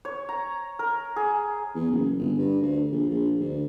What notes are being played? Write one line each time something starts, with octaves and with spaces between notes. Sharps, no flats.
C#5
A#5
A#4
G#4
E2
F#1
G1
G2
D2
A#1
A#1
D2